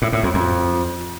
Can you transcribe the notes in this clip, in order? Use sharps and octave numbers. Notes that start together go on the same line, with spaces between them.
A2
A2
F2
F2